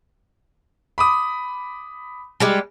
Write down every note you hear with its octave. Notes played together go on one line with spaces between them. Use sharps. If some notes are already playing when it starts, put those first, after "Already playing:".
B5 D6 D#6
G3 G#3 G4